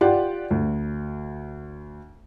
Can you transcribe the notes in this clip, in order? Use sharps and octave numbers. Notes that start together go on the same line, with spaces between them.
F4 G4 D5 F#5
D2